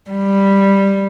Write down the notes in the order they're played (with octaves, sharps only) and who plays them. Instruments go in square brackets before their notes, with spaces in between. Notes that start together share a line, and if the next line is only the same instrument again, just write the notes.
[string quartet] G3